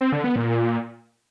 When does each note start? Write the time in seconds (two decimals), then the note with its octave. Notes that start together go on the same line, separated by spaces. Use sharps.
0.01 C4
0.12 D3
0.24 B3
0.36 A#2